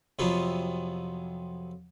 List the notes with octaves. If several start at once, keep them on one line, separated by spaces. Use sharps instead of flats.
F2 C3 F#3 B3 F4